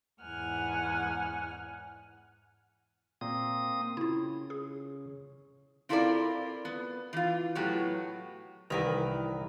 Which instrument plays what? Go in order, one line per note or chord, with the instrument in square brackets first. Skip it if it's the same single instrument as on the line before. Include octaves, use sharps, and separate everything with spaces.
[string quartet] E2 G#2 F#5 G#5 F6
[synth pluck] A#2 [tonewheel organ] A#3 C4 D#6
[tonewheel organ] C#3 [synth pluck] E4 F4
[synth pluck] G#4
[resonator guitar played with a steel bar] C4 E4 F4 A4 A#4 D5
B3
E3 F4
A2 F#3 B3 G4 C#5
[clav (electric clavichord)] C2 D#3 A#5 [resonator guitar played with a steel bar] E3 A#4 B4